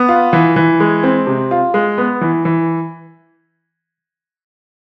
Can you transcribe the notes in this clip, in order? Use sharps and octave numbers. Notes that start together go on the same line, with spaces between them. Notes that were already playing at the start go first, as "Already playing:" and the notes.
Already playing: B3
F4
E3
E3
G#3
C4
C3
F4
G#3
B3
E3
E3